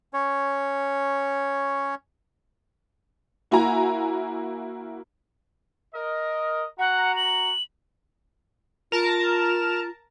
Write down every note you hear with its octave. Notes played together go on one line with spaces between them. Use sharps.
C#4 C#5
A#3 E4 F#4 G#5 A#5
A#4 D#5
F#4 F#5 A#5
F#7
F4 A#4 A5 A#5